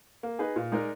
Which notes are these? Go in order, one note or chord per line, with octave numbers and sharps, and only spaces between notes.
A#3
D#4 G#4 B4 D#5
A#2
G#3 D#4 A#4 D5